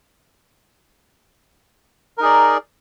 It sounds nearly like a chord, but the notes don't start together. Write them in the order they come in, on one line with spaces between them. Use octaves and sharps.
A#4 D#4 G#4 D5